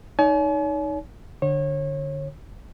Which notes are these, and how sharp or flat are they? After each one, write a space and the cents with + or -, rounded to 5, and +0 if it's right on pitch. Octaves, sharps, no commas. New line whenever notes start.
D#4 +0 C#5 +40 G#5 +45
D3 +10 C#5 -30